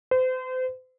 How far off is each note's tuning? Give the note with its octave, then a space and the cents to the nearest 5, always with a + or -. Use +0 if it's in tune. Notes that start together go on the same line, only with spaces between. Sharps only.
C5 -35